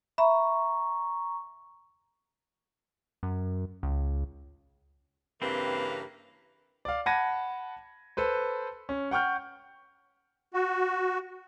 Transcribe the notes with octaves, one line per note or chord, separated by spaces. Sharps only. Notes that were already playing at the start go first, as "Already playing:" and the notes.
E5 A#5 B5 C#6
F#2
C#2
G2 C#3 E3 A#3 C4 B4
D5 F5
F#5 A5 B5 G#6 A#6 D#7
A4 B4 C5
C#4
F#5 G5 C#6 F6 G6
F#4